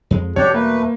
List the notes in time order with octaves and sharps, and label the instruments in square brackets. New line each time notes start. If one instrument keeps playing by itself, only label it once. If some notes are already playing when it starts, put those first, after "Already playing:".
[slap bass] F2 G#3
[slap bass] E2 B2 G3 [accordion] D4 G4 A4 [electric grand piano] C#5
[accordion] A3 B4 [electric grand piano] A#3